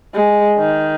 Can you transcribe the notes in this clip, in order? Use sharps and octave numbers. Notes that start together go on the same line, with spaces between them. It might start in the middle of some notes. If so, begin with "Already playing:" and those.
G#3
D#3